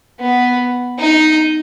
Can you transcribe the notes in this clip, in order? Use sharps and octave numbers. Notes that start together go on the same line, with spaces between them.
B3
D#4